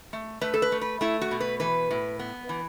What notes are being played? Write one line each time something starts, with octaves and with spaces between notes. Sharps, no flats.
A3
A3 B4
A4
B4
A3
B4
A3 E4
F#4
B2
B4
E3 B4
A2
B3
E3